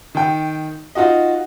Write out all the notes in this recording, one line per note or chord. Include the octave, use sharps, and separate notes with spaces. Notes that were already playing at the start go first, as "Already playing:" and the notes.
D#3 G5
D#4 F4 F#4 D#5